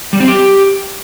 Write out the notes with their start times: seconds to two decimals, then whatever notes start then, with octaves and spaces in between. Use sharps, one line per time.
0.13 G3
0.20 C4
0.28 G4